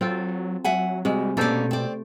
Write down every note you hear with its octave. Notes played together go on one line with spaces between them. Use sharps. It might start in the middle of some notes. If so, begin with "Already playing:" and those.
F#3 C4 F4 A4
F#3 E5 F#5 G#5
C3 G3 G#3 F#4
B2 A3 A#3 C#4 A4 C5 D5
C4 D5